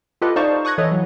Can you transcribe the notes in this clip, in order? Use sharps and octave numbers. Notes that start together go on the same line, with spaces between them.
F4 G4 A4 B4 D#5
D#4 C5 D5 F5 A5 C#6
C#6 D#6 F#6 G#6 A#6
E3 A4 B4 C#5 D#5
E3 F#3